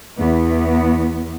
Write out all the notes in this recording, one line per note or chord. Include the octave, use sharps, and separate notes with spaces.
E2 B3